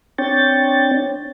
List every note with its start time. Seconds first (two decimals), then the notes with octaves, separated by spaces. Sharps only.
0.18 C4 D4 C#5 G5 A6